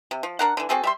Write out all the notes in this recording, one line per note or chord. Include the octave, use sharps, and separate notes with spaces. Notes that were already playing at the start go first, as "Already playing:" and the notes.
C3
F3
D4 A#4 F#5
D3 E3
C4 F#4 G#4 A4
G3 E5 C6